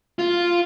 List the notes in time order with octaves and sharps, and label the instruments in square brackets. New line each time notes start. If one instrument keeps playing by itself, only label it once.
[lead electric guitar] F4